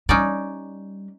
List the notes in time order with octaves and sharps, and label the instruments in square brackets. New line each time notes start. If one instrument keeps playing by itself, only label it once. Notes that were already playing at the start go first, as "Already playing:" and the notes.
[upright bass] G3 [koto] C#4 D#4 D5